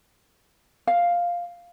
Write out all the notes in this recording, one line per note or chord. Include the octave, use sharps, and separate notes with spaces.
F5